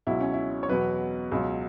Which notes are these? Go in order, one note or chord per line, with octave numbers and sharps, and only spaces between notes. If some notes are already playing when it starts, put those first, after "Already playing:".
C#2 B2 F#3 E4
C#4
E4
C#5
E2 B2 F#3 B4
C#2 B2 F#3